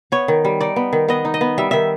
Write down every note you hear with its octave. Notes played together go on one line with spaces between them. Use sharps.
B3 C#5
D#3
G3
D#4 D5
B3
D#3
B3 D#5
D#4
D#5
B3
G3 E5
D#3 E5